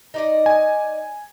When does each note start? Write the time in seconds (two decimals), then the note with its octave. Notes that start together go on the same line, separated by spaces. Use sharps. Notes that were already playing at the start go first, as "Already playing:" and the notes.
0.14 D#4 D5 D#5
0.46 G#5